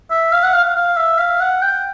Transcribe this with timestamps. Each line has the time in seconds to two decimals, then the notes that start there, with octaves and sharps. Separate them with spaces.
0.11 E5
0.32 F5
0.43 F#5
0.53 F5
0.64 F5
0.76 F5
0.97 E5
1.18 F5
1.40 F#5
1.62 G5